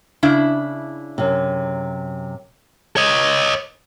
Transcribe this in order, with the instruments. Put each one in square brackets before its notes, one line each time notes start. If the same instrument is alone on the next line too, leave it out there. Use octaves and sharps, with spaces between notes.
[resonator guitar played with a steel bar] C#3 D4 E4
[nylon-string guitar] F#2 C3
[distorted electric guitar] C#5 D#5